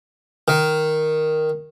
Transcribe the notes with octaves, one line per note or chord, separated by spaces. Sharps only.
D#3